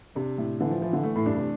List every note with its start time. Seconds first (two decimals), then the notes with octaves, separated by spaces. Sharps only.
0.15 C3 D4
0.38 A2
0.60 D3 E3
0.70 F3
0.81 E3 F3
0.93 D3
1.03 A3
1.15 A2
1.26 G2 D4
1.36 C3